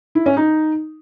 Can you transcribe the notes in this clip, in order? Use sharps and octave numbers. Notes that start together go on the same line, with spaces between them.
E4
C#4
D#4